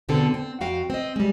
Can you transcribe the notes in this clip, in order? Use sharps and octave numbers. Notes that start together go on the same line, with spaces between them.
E2 B2 D3 C4 A4
C4
F2 F#4 F5 G5
C4 D#5
G3 G#3